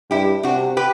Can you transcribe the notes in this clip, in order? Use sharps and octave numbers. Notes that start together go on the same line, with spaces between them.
G2 E4 G4
C3 D4 F#4
G4 B4